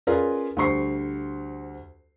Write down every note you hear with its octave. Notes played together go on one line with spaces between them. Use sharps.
C#4 F4 G#4 A#4 B4 D5
D2 G3 C5 C#6 C7